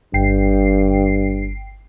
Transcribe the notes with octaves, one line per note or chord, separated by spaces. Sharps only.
G1 G2 G5 C7